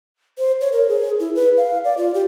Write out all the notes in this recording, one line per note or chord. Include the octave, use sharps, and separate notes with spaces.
C5
C#5
A#4
G#4
E4
B4
F5
D5
F4
G4